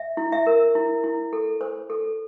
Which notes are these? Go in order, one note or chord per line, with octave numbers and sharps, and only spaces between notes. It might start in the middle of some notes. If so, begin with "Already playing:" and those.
Already playing: E5
E4
E5
A#4
E4
E4
A4
C5
A4